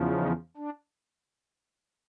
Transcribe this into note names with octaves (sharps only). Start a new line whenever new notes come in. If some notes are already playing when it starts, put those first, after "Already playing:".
Already playing: E2 C#3 F3
D#4
D4